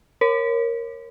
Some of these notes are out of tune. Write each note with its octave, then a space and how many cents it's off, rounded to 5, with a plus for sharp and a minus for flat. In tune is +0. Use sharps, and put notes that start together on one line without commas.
A#4 +0 C#5 -25